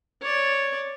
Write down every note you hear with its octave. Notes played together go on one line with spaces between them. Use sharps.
C#5 D5